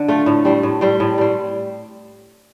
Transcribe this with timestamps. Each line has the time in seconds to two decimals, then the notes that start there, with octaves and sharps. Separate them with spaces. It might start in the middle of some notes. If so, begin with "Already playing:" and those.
Already playing: D3
0.08 A3 F4
0.26 A2
0.45 G3 C4
0.63 A2
0.81 G3 C4
1.00 A2
1.18 G3 C4